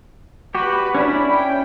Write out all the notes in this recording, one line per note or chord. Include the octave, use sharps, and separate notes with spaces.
F#4 G4 B4
C#4 D4 E4 B5
G5